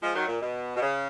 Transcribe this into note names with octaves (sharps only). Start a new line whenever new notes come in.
F3 G#3
D#3 F#3
A#2
B2
B2
C#3